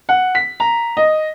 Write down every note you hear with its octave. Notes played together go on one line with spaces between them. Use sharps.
F#5
B6
A#5
D#5